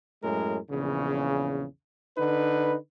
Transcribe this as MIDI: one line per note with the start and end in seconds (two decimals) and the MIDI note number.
0.23 0.58 42
0.23 0.58 45
0.23 0.58 56
0.23 0.58 70
0.70 1.64 34
0.70 1.64 40
0.70 1.64 49
2.18 2.75 50
2.18 2.75 63
2.18 2.75 71